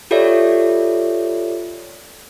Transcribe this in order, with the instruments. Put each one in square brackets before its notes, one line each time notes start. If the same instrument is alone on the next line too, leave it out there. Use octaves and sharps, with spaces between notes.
[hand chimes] F4 G4 A4 C#5 D5 E5